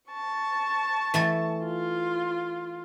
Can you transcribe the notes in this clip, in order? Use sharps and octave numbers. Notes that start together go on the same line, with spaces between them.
A5 C#6
E3 A3 A4
F4